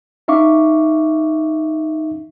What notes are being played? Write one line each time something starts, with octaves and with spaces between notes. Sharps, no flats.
C#4 D#4 E5 F5 C#6 D6